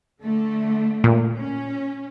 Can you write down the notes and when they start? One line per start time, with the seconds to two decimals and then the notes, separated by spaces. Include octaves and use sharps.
0.21 D3 A3
1.04 A#2
1.38 C#4